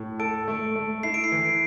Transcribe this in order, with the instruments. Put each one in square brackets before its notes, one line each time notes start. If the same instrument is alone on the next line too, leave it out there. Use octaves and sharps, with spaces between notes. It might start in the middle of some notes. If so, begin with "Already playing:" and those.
Already playing: [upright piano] A2
[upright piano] A4 [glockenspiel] D7
[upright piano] A3
A3
[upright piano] E4 [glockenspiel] C7
[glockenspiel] D7
C7
[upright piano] E3